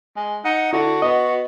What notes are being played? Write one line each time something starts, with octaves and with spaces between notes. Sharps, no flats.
G#3
D#4 F#5
D3 E4 F#4
B3 D#5